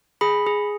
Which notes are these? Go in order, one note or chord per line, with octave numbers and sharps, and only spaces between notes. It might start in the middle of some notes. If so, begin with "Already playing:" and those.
G#4 B5
G#4